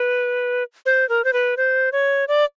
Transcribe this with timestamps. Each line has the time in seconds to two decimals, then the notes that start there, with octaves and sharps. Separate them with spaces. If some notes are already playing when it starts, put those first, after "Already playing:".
Already playing: B4
0.86 C5
1.09 A#4
1.25 C5
1.33 B4
1.57 C5
1.92 C#5
2.28 D5